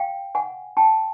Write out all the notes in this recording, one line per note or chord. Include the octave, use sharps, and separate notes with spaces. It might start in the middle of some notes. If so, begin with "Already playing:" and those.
Already playing: F5 G5
F#5 G#5
G5 A5